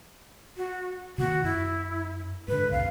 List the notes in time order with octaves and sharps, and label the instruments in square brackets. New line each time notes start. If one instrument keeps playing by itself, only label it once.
[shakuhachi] F#4
[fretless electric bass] C3 D#3 A#3 [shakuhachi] F#4
[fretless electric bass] F#2 [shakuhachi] E4
[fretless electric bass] G#2 D3 [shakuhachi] B4
[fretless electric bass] C2 F2 C3 [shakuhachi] F5